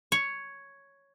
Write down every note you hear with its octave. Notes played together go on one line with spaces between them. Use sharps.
C#5